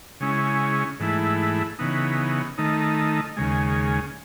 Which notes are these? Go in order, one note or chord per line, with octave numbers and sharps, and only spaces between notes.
C#3 G#3 C#4 E4
G#2 E3 A3 E4
C#3 E3 B3 D#4
D#3 A3 D#4
D#2 C#3 G#3